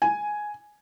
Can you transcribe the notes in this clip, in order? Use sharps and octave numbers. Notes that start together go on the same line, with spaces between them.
G#5